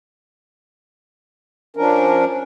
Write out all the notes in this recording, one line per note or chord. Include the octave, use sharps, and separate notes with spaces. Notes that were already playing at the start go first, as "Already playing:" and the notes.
F3 C#4 D4 A#4